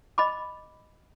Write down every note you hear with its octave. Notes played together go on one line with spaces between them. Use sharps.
D#5 B5 D6